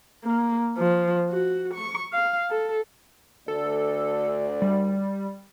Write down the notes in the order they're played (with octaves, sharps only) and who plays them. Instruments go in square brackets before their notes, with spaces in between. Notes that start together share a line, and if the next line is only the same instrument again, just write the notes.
[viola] A#3
F3
F#4
C#6
F5
A4
[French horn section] D2 D5 [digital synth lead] A4
[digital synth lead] G3